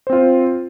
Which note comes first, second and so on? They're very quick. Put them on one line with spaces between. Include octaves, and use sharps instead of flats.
C5 C4 F4